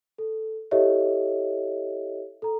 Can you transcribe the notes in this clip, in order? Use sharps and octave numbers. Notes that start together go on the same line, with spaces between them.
A4
E4 G4 A4 C#5 D#5 E5
A4 A#5